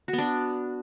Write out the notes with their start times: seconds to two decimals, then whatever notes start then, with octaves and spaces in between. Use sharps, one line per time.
0.08 F#4
0.13 B3
0.18 D4